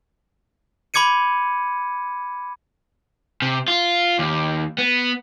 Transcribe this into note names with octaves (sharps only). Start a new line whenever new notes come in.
B5 C6 D6 G#6 C#7 D#7
C3
F4
D#2
B3